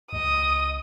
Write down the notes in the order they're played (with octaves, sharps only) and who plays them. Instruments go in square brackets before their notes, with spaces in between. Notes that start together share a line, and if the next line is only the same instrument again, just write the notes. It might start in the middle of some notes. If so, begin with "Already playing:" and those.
[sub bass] C#2 [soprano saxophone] D#5 [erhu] D#6